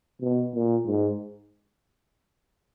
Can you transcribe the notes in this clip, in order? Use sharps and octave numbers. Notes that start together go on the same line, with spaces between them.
B2
A#2
G#2